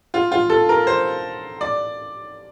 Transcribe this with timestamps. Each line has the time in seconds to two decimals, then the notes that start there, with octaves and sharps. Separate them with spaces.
0.14 F4
0.32 F4
0.50 A4
0.69 A#4
0.87 C5
1.61 D5